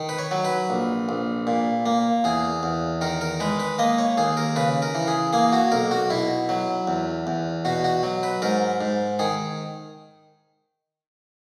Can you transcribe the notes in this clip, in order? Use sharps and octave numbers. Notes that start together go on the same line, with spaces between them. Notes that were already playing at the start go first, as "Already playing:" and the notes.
Already playing: D#3
B4
C#5
F#3
B4
A#1
A#1
A#2
A#3
E2 G#4
E2
D#3 A#4
A#4
G#3 B4
B4
A#3 D#5
C#5
D#2 G#4
A#4
C#3 B4
A#4
E3
G#4
A#3 G#4
F#4
B1 A#4
F#4
B2 E4
F#3
E2
E2
B2 F#4
F#4
F#3
B4
G#2 A#4
G#2
D#3 G#4